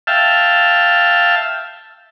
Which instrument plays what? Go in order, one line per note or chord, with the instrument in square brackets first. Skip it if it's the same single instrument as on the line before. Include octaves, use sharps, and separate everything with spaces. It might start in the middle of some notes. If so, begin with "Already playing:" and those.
[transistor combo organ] E5 F5 G5 A5